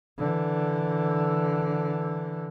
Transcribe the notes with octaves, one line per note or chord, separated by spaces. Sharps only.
D3 E3